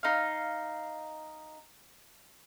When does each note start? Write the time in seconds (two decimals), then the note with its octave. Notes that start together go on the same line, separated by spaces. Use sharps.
0.03 D#4 F5